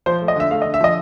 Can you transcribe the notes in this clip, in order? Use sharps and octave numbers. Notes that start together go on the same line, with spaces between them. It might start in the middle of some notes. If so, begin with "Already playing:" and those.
F3 C5
A3
D#5
D3 E5
A3 F5
D#5
D3
E5
F3 D#5